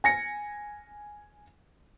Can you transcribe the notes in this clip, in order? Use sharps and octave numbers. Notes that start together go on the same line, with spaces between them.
G#5 A#6 C#7